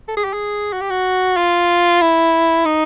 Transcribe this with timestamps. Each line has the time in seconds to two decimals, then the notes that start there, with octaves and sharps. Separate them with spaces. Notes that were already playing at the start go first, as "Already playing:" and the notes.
0.08 A4
0.17 G#4
0.24 G4
0.33 G#4
0.73 F#4
0.81 G4
0.90 F#4
1.37 F4
2.01 E4
2.65 D#4